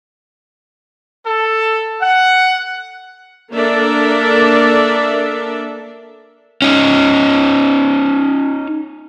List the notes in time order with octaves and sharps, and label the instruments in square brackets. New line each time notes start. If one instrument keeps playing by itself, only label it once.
[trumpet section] A4
F#5
[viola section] A#3 D4 A4 A#4 D5 E5
[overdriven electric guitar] C#4 D#4